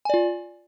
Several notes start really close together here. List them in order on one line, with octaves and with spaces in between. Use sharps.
G#5 D5 F4